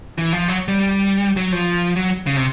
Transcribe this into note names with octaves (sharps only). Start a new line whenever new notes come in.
E3
F3
F#3
G3
F#3
F3
F#3
C#3
C3